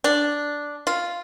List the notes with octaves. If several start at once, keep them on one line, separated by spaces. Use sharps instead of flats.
D4
F4